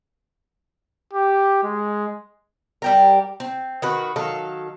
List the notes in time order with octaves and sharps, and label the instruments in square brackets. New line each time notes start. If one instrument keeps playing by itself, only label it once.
[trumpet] G4
G#3
[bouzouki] G3 G4 A#4
C4
D#3 F#4 B4
D#3 F#3 A4 F5